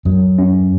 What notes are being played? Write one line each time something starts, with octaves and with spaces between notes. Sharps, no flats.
F#2 F#3
C#4